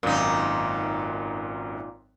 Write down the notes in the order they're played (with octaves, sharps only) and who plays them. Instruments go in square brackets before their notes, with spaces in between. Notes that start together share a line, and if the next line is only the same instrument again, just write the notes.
[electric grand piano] G#1 F#2 [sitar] A#2 D#4